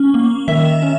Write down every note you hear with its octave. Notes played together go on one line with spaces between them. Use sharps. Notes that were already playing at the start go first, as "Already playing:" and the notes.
Already playing: C#4
A#3
D#3 E5
C#4